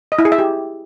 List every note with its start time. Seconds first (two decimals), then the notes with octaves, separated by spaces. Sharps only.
0.12 D#5
0.19 E4
0.25 G#4
0.32 E5
0.39 G4